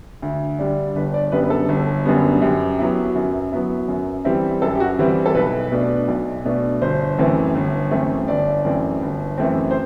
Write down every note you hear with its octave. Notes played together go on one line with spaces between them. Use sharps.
D2
D3 G3 D4
G1 B4
D5
F#2 D3 G3 B3 B4
B4
A4
G1
F#2 D3 G3 B3
F#2 G4
F#3 B3 E4
F#2
F#3 B3 E4
F#2
E3 G3 C4 E4
F#2 A4
G4
F#4
E3 G3 C4 E4
A4
B1 B4
B2 A3 D4
B1
B2 A3 D4
G1 C5
F#2 E3 A3 C4
G1
F#2 E3 A3 C4
G1 D5
F#2 E3 A3 C4
G1
F#2 E3 A3 C4
C5